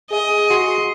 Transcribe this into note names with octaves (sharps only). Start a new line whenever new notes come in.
G#4 D#5
F#4 G#4 C6